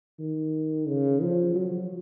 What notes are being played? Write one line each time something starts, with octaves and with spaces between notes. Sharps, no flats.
D#3
C#3
F3
F#3